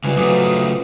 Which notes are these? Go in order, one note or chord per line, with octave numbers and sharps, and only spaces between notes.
C#2 C#3 E3 F3 G3
C#3 F#3 A3 D5 D#5